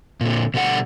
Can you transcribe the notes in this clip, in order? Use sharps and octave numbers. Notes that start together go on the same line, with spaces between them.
A#2 D3
B2 D3 G3 A4 F#5